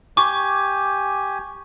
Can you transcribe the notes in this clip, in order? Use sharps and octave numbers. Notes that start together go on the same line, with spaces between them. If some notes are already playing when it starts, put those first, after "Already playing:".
G4 G#5 C#6 D6